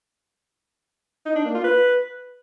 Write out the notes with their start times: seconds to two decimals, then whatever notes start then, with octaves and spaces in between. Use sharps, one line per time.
1.26 D#4
1.35 D4
1.45 A#3
1.55 F4
1.64 B4